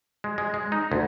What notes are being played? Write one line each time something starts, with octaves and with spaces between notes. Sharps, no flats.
G#3
G#3
G#3
D#4
D2